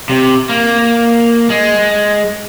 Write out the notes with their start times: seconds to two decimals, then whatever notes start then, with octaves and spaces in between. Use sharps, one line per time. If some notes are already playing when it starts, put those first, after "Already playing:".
0.09 C3
0.49 A#3
1.50 G#3